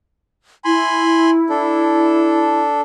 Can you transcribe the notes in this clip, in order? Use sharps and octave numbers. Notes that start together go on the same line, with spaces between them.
E4 G#5 B5 C6
D4 A4